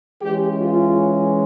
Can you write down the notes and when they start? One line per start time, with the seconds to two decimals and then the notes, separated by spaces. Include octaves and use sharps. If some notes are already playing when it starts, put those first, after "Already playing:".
0.21 E3 G#3 C#4 G4
0.60 F4